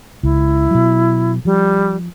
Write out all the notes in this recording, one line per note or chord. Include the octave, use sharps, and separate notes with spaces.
C#2 E4
B2 F#3
F3 G3